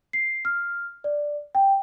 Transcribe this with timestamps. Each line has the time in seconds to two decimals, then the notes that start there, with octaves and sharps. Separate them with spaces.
0.13 C7
0.45 F6
1.04 D5
1.55 G5